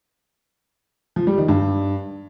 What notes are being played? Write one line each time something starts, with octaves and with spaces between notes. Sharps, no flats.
F3
G3
D#3
G2